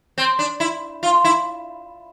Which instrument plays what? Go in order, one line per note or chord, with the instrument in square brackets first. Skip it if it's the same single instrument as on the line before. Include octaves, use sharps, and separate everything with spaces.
[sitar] C4
D4
E4
F4
E4